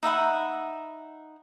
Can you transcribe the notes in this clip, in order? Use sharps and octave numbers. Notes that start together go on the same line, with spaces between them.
D#4 E5 F#5 B5